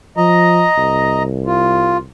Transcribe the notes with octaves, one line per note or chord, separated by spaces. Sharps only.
F3 D#5 A#5
C2
F4